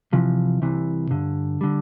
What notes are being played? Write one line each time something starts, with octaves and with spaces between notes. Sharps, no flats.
C2 C3 E3 F3
C2 C3 E3
G2 D3
D3 G3